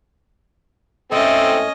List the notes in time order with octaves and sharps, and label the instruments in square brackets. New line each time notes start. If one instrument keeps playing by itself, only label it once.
[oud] G#2 A3 E4 [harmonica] C4 A4 [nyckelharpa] C#4 D#5